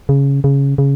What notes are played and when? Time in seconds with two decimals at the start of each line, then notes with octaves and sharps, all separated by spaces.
0.09 C#3
0.44 C#3
0.78 C#3